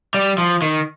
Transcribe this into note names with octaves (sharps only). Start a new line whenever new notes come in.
G3
F3
D#3